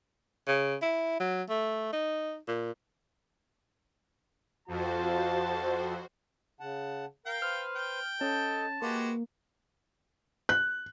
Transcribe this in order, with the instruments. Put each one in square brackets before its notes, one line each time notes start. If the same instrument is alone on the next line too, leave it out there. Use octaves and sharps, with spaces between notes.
[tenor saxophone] C#3
E4
F#3
A3
D#4
A#2
[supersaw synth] F2 [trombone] F4 [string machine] F#4 C5 [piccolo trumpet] A5
[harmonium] C#3 F#5 A5
[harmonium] A#4 [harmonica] F5 G5
[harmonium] B4 C5 [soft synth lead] F6
[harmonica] G5
[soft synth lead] C#4 [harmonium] A4 D#5 [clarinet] A5
[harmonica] G#3 F#4 G4 [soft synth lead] A#3 [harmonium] B4
[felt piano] F#6